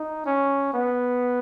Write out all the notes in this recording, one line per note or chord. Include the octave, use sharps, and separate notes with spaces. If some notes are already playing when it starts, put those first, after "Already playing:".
Already playing: D#4
C#4
B3